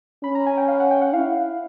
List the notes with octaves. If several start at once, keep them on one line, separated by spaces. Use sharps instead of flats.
C#4 B5
A#5
G#5
G5
F5
F#5
G5
F#5
E4 F5